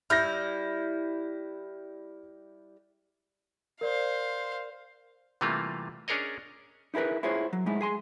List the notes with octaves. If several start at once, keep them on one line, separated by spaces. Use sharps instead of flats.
G3 E4 F6 G6 A#6
A#4 C5 D5 F5
C3 E3 G3 A3 A#3 F4
C#4 D4 G#4 A#4 C#5 D#5
D#4 E4 G#4 A#4 B4
E4 F4 G#4 C5 C#5
F#3
A2 G#3 D#4 E4
G#4 G#5 C6